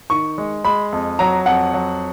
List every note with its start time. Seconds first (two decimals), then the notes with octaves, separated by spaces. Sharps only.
0.10 D#3 C#6
0.38 G#3
0.65 G#3 B5
0.92 F2
1.19 F#3 A#5
1.46 F2 F#5
1.74 F#3